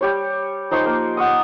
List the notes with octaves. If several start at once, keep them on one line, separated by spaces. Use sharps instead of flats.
G3 G4 C#5
F3 D#4 C6 C#6
A#3
D#5 F#5 C#6 D#6